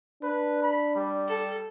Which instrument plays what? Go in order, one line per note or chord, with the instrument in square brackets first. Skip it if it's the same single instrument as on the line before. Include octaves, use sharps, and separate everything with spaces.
[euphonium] D4 [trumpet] B4
[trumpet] B5
G3
[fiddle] A4